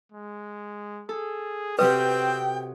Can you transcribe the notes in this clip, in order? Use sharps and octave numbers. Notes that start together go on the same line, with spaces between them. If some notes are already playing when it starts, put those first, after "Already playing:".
G#3
G#4 A4
C3 F#3 C4 B4 G5 D#6